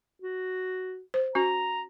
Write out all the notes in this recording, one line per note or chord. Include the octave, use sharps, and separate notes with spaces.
F#4
C5
C#4 F#4 A#5